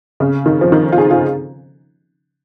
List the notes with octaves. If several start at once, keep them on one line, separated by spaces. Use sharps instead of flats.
C#3
D#3
F3
D#3
F4
G#4
F4